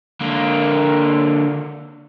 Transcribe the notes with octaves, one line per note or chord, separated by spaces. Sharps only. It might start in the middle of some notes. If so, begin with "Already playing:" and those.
D3 A#3